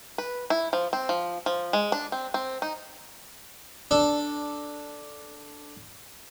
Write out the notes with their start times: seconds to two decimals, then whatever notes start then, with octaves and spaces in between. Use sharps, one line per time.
0.18 B4
0.50 E4
0.73 F3
0.93 C4
1.09 F3
1.46 F3
1.73 G#3
1.92 D4
2.12 C4
2.34 C4
2.62 D#4
3.91 D4 A4